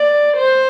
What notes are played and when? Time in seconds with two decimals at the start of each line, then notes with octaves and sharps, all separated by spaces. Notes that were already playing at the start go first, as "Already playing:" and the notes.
Already playing: D5
0.37 C5